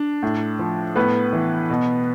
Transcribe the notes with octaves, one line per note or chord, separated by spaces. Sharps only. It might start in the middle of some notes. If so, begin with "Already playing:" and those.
Already playing: D4
A2
F3
A2 B3 B4
E3
B2